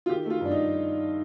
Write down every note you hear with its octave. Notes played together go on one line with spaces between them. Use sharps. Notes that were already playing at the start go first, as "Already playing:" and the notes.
F4
D#3 G4
A3
F4
G2 D4
D#4